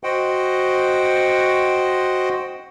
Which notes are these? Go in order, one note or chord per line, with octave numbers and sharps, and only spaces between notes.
F#4 C5 D#5 F#5 G5